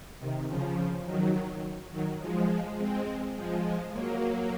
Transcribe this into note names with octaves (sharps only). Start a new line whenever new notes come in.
C3 D#3
C#3 F3
D#3 F#3
D#3 F#3
F3 G#3
F3 G#3
G#3 C4
F3 G#3
F3 G#3
F#3 A#3
F#3 A#3